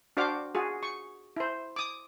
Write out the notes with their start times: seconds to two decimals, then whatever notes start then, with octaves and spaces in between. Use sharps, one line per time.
0.17 D4 F#4 C5 F5 G5 D6
0.55 F4 F#4 G#4
0.83 C#6
1.36 E4 C5
1.76 D6 D#6